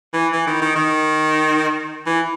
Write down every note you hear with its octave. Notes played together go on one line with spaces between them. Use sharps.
E3
E3
D#3
D#3
D#3
E3